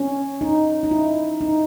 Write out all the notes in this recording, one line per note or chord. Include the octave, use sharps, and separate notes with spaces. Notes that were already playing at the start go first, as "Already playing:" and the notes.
Already playing: C#4
D#4
D#4
E4
D#4